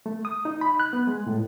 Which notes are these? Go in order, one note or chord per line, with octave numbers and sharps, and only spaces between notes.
A3
D#6
D#4
B5
F#6
B3
G#3
A2